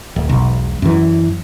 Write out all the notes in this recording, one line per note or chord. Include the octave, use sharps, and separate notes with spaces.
D1
E1 B1
F#2 E3